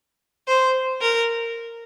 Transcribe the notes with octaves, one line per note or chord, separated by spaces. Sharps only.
C5
A#4